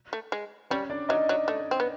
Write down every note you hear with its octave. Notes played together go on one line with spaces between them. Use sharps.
A3
G#3
G3 C#4 C#5
D4 D5
F#3 D#4 D#5
F#3
A3
C4
B3